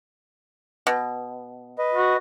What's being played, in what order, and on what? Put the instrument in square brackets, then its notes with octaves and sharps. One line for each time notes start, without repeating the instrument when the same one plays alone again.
[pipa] B2
[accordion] B4 D#5
[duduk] F#4